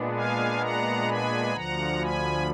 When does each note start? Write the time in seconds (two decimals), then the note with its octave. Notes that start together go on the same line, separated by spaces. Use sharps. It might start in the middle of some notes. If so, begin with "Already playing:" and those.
Already playing: A#2 G#3 B3 D4
0.13 F5 G#5
0.60 F#5 A#5
1.07 G#5 B5
1.53 D2 D3 F3 F#5 A#5
2.00 G#5 B5